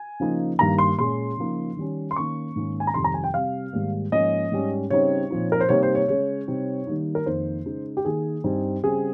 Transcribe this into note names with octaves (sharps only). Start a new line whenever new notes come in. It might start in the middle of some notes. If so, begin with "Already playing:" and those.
Already playing: G#5
C#3 F3 A#3 D#4
G2 D#3 G3 A#3 A#5
C6
A#2 G#3 C#4 C6
C#3 F3 A#3 D#4
D#3 G3 C#4
C6
D#3 A#3 C#4 C#6
G#2 D#3 A#3 C#4
G#5
A#5
F2 C3 D#3 G3 C6
A#5
G#5
G5
C3 G3 C4 F5
G#2 D#3 G3 A#3
G#2 F3 A#3 C#4 D#5
G#2 G3 C#4
C#3 G3 C4 D#4 C#5
A#2 F3 C4 D#4
A#4
C5
C3 G3 A#3 D#4 C#5
C5
C#5
C#3 G#3 C#4 C#5
C3 G3 C4 D#4
D#3 G3 A#3 D#4
A#4
F2 D#3 A#3 D#4 C5
C#3 G#3 D#4
G4
D#3 A#3 D#4 G#4
G2 G3 C4 D#4
C#3 G3 C4 G#4